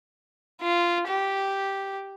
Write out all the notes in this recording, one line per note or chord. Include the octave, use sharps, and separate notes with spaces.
F4
G4